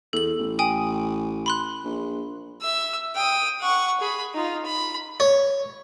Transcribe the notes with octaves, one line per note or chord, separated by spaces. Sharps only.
E2 A4 F#7
A1
G5 G#5 D#6
B5 C6 F#6
A#1
E5 E6
G5 D#6
F#5 C#6
G#4 B5
D#4 F4
B5
C#5